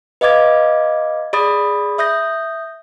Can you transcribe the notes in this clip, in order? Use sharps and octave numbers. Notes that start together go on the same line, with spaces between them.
B4 D#5 F5 D6 G#6 A6
G#4 D5 B5 D#6 A6
E5 D#6 G6 A#6